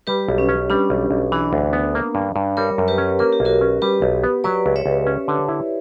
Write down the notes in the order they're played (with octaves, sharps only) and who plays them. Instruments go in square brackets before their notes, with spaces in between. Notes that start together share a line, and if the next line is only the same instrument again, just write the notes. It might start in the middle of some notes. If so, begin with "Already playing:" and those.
[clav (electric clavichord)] G3 [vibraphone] G4 B4
[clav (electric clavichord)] B1
[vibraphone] C#4
[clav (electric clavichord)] C#4
[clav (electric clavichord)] G3 [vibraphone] D4
[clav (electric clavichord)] B1
B1
[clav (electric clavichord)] E3 [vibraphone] D4
[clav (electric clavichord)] D2
B3
A#3
G2
G2
[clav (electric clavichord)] G3 [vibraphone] A#4 C#5
[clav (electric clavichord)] F#2
[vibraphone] G4 B4
[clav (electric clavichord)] C#4
[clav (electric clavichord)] A#3 [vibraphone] A#4
[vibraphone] G4
[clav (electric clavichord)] B1
[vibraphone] F#4 A#4
[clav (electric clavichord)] C#4
[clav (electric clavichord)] G3 [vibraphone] G4 B4
[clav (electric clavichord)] B1
B3
[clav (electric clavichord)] F#3 [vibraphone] B4 D5
[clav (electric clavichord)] C#2
[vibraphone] C#5 E5
[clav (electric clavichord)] C#2
C#4
D3
E4